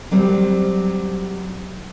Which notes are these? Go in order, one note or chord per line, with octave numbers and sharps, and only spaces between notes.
F#3 G3 C4